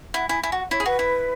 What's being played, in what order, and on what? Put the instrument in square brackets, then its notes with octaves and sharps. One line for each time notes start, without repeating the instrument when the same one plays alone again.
[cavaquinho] E4 [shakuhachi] F#5
[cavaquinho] E4 [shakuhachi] G#5
[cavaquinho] E4 [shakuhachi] G#5
[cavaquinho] F#4
[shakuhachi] F#5
[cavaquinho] E4 [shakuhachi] C#5
[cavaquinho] G#4
[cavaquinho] F#4 [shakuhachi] B4
[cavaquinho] E4